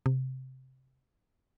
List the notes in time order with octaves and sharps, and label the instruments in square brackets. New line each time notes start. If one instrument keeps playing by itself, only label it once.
[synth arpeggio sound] C3